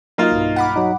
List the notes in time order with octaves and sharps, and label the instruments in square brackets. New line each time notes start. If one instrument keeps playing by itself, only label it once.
[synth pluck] F#3 D#5 [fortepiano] A#3 F4 [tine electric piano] D#4
[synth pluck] B1 G2
F#5 B5 D6
[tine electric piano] F#3 D#4